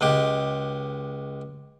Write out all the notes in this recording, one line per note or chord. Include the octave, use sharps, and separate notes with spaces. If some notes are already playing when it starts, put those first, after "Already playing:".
C#2 G#3 G4